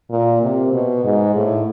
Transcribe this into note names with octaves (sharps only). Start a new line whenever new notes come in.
A#2
C3
B2
G#2
A2